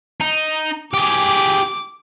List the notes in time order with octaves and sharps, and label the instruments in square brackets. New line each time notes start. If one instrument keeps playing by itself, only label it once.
[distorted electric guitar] D#4
[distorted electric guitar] G4 G#4 [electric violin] D6